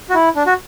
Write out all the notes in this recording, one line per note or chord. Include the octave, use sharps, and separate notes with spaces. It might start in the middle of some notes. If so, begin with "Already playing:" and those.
F#4
E4
D4
F#4